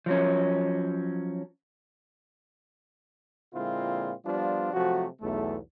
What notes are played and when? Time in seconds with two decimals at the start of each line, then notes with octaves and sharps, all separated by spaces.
0.06 F3 F#3 C#4
3.54 A#2 D3 G#3 C4 E4 F4
4.26 F3 G3 B3 D4 F4
4.73 C3 F3 F#3 A3 F#4
5.21 B1 E2 A3